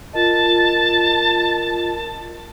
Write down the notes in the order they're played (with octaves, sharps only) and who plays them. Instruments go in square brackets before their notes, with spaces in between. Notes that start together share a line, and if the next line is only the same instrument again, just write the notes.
[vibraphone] F4 A#4 D#5 [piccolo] A5